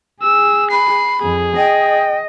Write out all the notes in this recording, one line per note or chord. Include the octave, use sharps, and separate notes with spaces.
G#4 E6
B5 C7
F2 G#4
D#5 G5